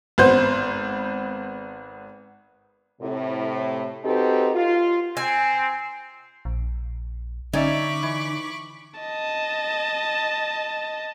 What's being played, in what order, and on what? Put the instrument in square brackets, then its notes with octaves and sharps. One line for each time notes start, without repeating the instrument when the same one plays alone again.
[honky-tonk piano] G#1 B3 C5 G6
[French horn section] A2 C3
C4 D#4 F#4 G4 A4 B4
F4
[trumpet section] C4 [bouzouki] G#5
[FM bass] A#1
[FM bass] D3 [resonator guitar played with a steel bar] C#4 D5 E5 [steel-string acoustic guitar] D#4 [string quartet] B5 C#6 D6
[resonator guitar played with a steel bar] E3
[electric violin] D#5 A5